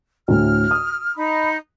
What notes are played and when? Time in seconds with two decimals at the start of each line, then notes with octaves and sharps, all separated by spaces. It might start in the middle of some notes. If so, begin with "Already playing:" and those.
0.28 D2 A2 F6
0.71 D#6
1.17 D#4 B5